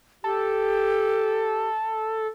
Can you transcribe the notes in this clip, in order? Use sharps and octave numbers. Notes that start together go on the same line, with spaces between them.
G4 A4